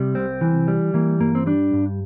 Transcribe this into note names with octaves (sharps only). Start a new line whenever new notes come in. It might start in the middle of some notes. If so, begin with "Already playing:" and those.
Already playing: C3 G3
C2 C4
E3
G3
E3 A#3
G2 A#3
C4
G3 D4
G2